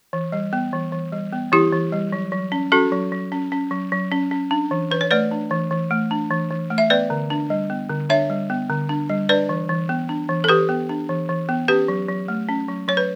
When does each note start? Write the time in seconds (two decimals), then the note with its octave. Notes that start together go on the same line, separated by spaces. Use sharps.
0.13 E3
0.32 G3
0.53 B3
0.73 E3
0.92 E3
1.12 G3
1.33 B3
1.52 E3 E4 G4
1.73 E3
1.92 G3
2.12 F#3
2.32 F#3
2.52 C#4
2.72 C#4 F#4 A4
2.92 F#3
3.12 F#3
3.32 C#4
3.52 C#4
3.71 F#3
3.92 F#3
4.12 C#4
4.31 C#4
4.51 D4
4.71 E3
4.91 E3 B4
5.01 C#5
5.11 A3 B4 D5
5.31 D4
5.51 E3
5.71 E3
5.91 A3
6.11 D4
6.31 E3
6.50 E3
6.70 A3
6.78 E5
6.90 B3 B4 D5
7.10 D3
7.30 D4
7.50 G3
7.70 B3
7.90 D3
8.10 D4 C#5 E5
8.30 G3
8.50 B3
8.70 D3
8.89 D4
9.09 G3
9.29 D4 B4 D5
9.49 E3
9.69 E3
9.89 B3
10.09 D4
10.29 E3
10.44 A4
10.49 E3 G4 B4
10.69 B3
10.89 D4
11.09 E3
11.29 E3
11.49 B3
11.68 C#4 G4 B4
11.88 F#3
12.08 F#3
12.28 A3
12.49 C#4
12.68 F#3
12.88 F#3 C#5
12.97 B4